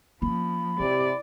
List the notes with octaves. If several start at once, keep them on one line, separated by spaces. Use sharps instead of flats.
F3 A#3 C#4 B5
C3 E4 G4 D5